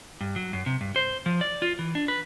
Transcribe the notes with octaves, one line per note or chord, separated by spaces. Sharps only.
G2
F#3
F#2
C3
G2
C5
F3
D5
F4
E3
D4
B4